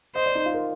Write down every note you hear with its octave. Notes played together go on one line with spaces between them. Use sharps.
C5 D#5
D5
D#4
F4
A#4